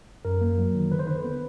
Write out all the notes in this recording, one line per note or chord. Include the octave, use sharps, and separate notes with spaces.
F#2 A#4
A#3
F#3
D#3
D3 B4
C5
D3 B4
B3